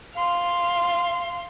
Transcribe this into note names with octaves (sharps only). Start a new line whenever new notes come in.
F5 C6